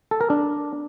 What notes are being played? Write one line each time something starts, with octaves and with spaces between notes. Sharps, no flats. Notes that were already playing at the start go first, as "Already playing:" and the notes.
A4
A#4
D4